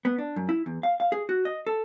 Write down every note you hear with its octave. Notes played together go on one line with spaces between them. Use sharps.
B3
D4
F#2
E4
E2
F5
F5
G#4
F#4
D#5
A4